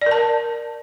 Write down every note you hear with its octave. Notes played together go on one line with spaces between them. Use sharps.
A#4 D5 A5